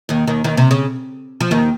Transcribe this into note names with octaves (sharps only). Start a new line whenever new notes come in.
D#2 D#3
D#2 D#3
D#2 D#3
C3
C#3
F3
D#2 D#3